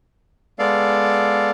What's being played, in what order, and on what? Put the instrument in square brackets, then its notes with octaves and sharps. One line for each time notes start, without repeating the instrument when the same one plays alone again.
[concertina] G#3 B3 A4 D5 F5